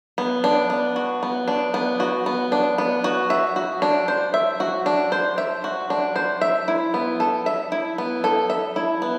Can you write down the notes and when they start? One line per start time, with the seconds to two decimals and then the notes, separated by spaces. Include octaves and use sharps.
0.18 B3
0.44 D4
0.70 B3
0.96 F#4
1.23 B3
1.48 D4
1.74 B3
2.00 F#4
2.26 B3
2.52 D4
2.78 B3
3.04 F#4
3.30 E5
3.56 F#4
3.82 D4
4.08 C5
4.34 E5
4.60 F#4
4.86 D4
5.12 C5
5.38 E5
5.64 F#4
5.90 D4
6.16 C5
6.41 E5
6.68 E4
6.94 B3
7.20 A4
7.46 E5
7.72 E4
7.98 B3
8.24 A4
8.50 E5
8.76 E4
9.02 B3